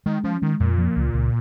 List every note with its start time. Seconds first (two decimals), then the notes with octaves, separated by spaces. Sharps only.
0.06 D#3 G#3
0.24 F3 C#4
0.42 D#3 G#3
0.60 F2 A#2
0.78 F3
0.96 C#2
1.14 C#2